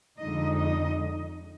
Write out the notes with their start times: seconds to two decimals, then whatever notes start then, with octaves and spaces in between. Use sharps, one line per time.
0.19 F2 D3 G#3 D#4 D#5
0.57 D#5